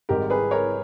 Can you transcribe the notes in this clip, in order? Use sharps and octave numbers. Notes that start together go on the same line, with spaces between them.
G#1 G#2 G3 G4 A#4
G#4 B4
A#4 C#5